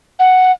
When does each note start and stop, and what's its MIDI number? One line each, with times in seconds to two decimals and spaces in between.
0.19 0.52 78